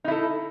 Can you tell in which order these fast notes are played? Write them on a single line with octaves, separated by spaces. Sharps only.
D#4 E4 A4